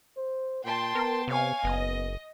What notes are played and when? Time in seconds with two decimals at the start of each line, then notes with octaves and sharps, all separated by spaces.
0.17 C5
0.64 A#2 G5 A5 C6
0.95 B3 A#4
1.28 C3 C#5 F5 G#5
1.64 F#1 B3 D#5